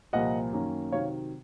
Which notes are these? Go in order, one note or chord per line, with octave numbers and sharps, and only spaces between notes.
C2 A#2 F3 A#3 D#5 F#5
F#2 D#3 A#3 C#4
C3 D#3 F#3 C#5 F5